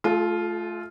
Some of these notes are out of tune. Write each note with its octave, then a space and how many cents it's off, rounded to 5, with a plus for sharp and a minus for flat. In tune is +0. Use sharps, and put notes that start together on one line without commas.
A3 -25 F4 +0 G#4 +35